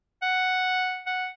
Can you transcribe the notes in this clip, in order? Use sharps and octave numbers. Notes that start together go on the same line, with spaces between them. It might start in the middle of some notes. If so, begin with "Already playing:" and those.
F#5
F#5